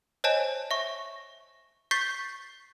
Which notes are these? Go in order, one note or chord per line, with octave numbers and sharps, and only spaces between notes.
C5 C#5 D#5 G#5 A5
E5 C#6
C#6 G6 A6 B6 C7